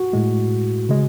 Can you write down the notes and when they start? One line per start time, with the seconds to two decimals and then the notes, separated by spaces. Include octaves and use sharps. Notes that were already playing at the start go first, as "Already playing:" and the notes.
Already playing: F#4
0.13 A2 G#3
0.89 C#3 G#3